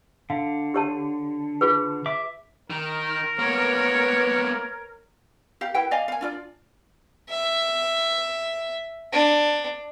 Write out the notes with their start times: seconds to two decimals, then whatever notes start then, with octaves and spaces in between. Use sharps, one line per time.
0.30 D3 F5
0.74 G4 C#5 A5
1.61 F4 G#4 B4
2.06 E5 D6
2.70 D#3 A#4
3.39 A#3 B3 B4 C#5 G#6
5.61 G4 F5
5.74 E4 G4 B4 G5
5.91 D5 D#5 F5 G#5
6.08 F5 G#5
6.21 D4 F4 D5
7.30 E5
9.13 D4